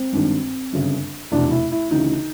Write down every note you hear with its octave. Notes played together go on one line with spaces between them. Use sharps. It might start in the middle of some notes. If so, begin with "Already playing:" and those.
Already playing: C4
G#1 G2 D#3
G1 F#2 C#3
F1 E2 B2 D4
E4
E4
D2 C#3 E3 D#4